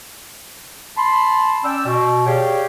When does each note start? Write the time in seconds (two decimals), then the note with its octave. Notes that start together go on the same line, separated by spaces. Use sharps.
0.97 A5 B5 C6
1.64 C#4 D5 G5 E6
1.87 B2
2.27 G4 G#4 C#5 D5 F5 G5